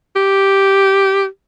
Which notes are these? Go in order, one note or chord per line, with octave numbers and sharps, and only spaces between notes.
G4